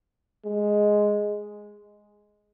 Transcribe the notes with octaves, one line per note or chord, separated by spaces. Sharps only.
G#3